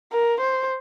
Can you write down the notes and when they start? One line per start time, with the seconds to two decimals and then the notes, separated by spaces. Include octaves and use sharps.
0.12 A#4
0.40 C5